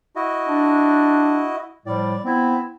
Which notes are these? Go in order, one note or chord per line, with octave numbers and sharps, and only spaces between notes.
E4 F#4 D#5
D4
A2 F3 G3 D5
B3 C4 E4